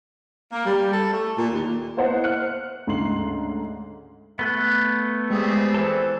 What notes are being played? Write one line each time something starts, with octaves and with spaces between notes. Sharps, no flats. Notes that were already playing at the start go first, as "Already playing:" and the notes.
A#3
G3
A4
A3
A#2
D#2
A#3 B3 E4 C5 D#5 F#5
F6 F#6 C#7
D2 G#2 C#3 C6 C7 F#7
A3 B3 A4 F#6
G3 G#3 C4 G#4
E3 A4 C5 A5